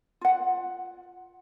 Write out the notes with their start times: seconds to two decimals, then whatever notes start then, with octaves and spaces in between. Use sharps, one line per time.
0.21 F4 F#5